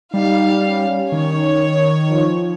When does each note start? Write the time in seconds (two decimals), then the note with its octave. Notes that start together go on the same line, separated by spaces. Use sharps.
0.14 G3 D#4 F5
0.67 C#4
1.12 D#3 C#5
2.09 F3